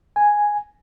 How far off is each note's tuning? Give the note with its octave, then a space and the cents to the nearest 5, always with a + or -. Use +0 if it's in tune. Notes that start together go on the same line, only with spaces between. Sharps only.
G#5 +0